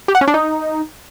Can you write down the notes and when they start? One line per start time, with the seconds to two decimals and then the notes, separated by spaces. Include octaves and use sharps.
0.08 G4
0.15 F#5
0.21 C#4
0.28 D4
0.34 D#4